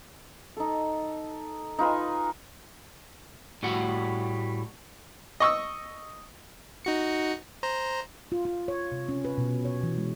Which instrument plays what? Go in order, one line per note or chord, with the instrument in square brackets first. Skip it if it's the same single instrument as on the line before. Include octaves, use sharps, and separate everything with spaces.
[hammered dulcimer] D#4 A4
D#4 F4 B4 G#5
[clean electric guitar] A2 G3 A3 F#4 F#5
[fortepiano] D#5 C#6 E6
[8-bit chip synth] D#4 F#4 C#7
C5 A#5
[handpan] F4
F4
C#5
C3
C#4
B4
B2
C#5
E3
G#3